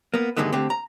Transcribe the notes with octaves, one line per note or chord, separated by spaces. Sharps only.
A#3 B3
G2 D3 D#3 G#3 A3 B3
D3 A3 C4 G4
A#5